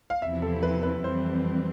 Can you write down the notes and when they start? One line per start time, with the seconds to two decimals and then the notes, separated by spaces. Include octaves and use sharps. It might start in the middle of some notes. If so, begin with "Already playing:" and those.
0.10 F5
0.22 E2 C3 F3 C4 E4 E5
0.42 A4
0.63 B4
0.83 B4
1.04 F2 E3 G3 C4 C5